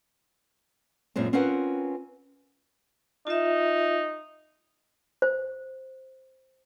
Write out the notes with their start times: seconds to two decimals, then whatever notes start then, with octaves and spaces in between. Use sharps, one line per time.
1.16 F#2 A#2 G#3 C4
1.33 C4 C#4 F4 A#4 B4 F#5
3.27 D#4 F4 E5
5.22 C5